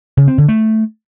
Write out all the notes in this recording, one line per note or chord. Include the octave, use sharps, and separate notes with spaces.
C#3
C4
D3
A3